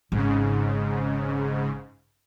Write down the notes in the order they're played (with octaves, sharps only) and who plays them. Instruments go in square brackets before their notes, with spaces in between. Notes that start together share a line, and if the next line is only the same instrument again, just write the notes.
[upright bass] G#1 [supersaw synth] G#2 C#3